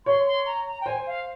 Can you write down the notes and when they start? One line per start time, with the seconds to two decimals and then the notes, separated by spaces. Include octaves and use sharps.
0.05 C#5 C6
0.26 C6
0.46 A#5
0.67 A#5
0.81 G5
0.86 C5 G#5
1.06 F5